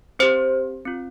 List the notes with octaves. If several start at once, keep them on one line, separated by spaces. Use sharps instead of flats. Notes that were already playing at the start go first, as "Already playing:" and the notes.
C4 G4 C5
C4 F4